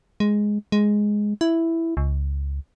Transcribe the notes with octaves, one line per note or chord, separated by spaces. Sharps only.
G#3
G#3
E4
C#2